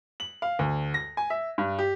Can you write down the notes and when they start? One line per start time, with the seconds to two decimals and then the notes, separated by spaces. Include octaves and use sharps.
0.20 F#7
0.42 F5
0.59 D2
0.94 A#6
1.17 G#5
1.30 E5
1.58 G2
1.79 G4